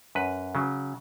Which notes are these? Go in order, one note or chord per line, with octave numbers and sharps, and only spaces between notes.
F#2 B4
C#3 F#3